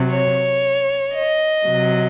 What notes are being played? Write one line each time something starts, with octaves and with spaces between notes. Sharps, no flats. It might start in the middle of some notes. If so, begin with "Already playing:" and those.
Already playing: C3 F#3
C#5
D#5
C3 F#3